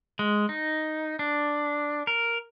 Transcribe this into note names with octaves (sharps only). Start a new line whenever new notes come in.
G#3
D#4
D4
A#4